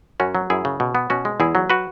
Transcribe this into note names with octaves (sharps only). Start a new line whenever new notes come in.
F#2 C#4 F#4
F#3
F#2 E4 G#4
C#3
B2
B3
B2 C#4 F#4
G#3
E2 E4 G#4
F#3
F#4 B4